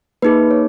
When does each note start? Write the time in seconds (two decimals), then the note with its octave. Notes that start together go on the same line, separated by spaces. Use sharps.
0.22 A#3 D#4 G#4 B4
0.51 C#5